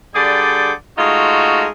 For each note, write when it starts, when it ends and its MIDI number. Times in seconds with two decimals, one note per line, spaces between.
0.14 0.72 50
0.14 0.72 55
0.14 0.72 68
0.14 0.72 74
0.14 0.72 79
0.98 1.66 56
0.98 1.66 57
0.98 1.66 63
0.98 1.66 65
0.98 1.66 66